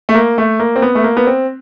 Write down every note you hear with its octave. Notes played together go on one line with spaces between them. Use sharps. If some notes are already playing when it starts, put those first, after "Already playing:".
A3
A#3
A3
A#3
C4
B3
A3
A#3
B3
C4